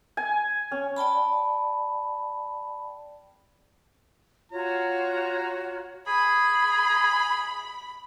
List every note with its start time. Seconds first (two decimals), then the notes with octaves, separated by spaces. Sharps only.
0.17 G#5
0.72 C#4
0.96 D5 G5 A5 B5
4.52 F4 F#4 C#5 A#5
6.07 G#4 B5